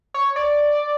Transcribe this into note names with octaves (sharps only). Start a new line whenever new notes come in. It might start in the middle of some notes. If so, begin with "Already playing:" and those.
C#5
D5